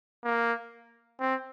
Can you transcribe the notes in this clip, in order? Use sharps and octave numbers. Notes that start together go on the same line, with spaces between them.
A#3
C4